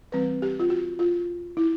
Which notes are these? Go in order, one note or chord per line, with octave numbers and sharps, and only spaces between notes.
E3 G3 C4 B4
G4
F4
F#4
F4
E4